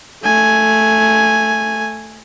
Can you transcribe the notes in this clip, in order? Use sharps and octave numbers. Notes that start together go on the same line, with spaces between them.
A3 G#5